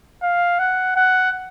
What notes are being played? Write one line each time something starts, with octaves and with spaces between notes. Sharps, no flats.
F5
F#5
F#5